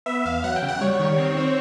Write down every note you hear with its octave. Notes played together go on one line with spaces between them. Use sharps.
B3 E5
E2 F5
F#3 F#5
G5
C#3
F#5
G3 C#5
D#3
C4
C4